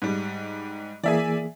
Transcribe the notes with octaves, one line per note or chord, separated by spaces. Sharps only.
G#2 G3
E3 A#3 G#4 D5 E5 G#5